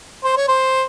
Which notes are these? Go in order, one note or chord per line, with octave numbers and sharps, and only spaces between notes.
C5
C#5
C5